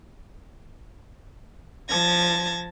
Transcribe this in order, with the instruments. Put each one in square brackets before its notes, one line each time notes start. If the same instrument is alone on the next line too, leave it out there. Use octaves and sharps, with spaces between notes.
[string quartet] F3 A5 G#6 A#6